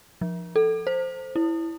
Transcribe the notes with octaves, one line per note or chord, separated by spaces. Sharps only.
F3
A4
C5
E4